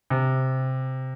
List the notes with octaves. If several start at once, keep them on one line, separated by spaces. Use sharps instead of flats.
C3